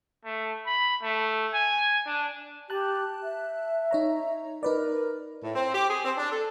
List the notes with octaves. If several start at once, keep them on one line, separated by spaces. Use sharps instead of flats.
A3
B5
A3
G#5
D4
G4 A5 F#6
E5
D#4 C#5 A#5
D#4 A#4 B4 D5
A2
C4
G4
G#4
C4
D4
A4